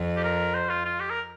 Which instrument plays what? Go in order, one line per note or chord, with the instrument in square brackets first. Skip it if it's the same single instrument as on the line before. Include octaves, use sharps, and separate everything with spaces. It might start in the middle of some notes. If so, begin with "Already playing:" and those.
Already playing: [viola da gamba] F2
[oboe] G4
A#4
C5
F4
F4
G4
A#4